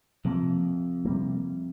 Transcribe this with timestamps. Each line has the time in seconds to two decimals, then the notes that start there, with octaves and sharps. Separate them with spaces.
0.25 F2 C3 F3 A#3
1.05 C3 G3 A#3